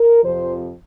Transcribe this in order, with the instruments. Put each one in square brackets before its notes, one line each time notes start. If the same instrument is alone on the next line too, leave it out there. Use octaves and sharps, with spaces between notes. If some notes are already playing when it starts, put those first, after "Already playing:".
Already playing: [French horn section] A#4
F2 C3 F3 C5